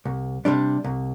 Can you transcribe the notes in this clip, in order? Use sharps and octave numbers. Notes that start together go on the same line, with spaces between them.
C2
C3 G3 D4
C2